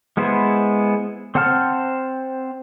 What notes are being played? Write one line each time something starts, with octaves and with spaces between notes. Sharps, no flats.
G#3 B3 E4 C5
C4 C5 F#5 A5 F6